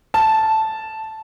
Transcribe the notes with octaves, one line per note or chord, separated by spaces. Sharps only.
A5